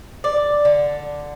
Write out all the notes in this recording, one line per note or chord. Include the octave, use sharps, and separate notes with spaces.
D5
D3